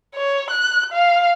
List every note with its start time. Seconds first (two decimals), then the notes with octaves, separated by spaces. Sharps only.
0.14 C#5
0.51 F#6
0.92 F5